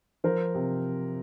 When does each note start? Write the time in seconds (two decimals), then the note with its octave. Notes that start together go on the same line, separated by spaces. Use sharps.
0.24 F3 A#4 C5
0.55 C3